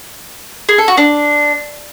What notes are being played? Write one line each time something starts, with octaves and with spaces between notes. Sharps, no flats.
G#4
A4
F#4
D4